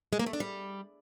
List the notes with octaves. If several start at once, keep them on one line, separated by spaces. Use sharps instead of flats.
G#3
A#3
A3
D4
G3